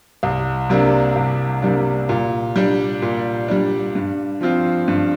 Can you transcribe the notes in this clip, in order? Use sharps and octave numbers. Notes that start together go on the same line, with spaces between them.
C2
C3 G3 A#3 D4
C2
C3 G3 A#3 D4
A#2
G3 D4
A#2
G3 D4
G2
F3 C4 F4
G2